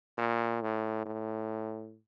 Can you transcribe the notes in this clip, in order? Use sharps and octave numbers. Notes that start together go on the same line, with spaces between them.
A#2
A2
A2